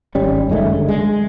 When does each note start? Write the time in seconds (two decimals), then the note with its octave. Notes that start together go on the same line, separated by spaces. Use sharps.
0.15 G#1 G3 C#4
0.49 F#1 D#3 G#3 A3
0.69 D3
0.88 G#3